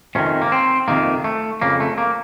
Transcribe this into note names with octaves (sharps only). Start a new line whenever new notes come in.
F2 C3 D#3 C#4
A#3
C4
F2 C3 D#3 A#3
A3
F2 C#3 A#3
A3
A#3